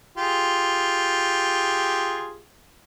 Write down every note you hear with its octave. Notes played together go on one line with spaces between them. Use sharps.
F4 G4 G#4